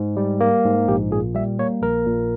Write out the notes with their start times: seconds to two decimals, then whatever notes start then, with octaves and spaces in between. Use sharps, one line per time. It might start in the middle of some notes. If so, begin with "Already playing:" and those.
Already playing: G#2
0.17 G3
0.40 A#3
0.65 G#2
0.87 A#1 G4
1.11 A#2 G#4
1.35 G3 E5
1.59 A#3 C#5
1.82 A#1 A#4
2.06 A#2